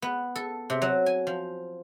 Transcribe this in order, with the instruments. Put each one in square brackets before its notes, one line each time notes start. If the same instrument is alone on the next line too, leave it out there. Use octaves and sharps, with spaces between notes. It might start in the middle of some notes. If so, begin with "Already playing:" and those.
[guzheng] B3
A4
C3
F#3
G#5
F3